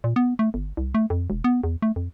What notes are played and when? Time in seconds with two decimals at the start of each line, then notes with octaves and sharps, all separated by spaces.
0.04 A#2
0.16 B3
0.39 A3
0.54 G1
0.77 C2
0.95 A3
1.10 F2
1.30 E1
1.44 B3
1.64 E2
1.82 A3
1.96 F2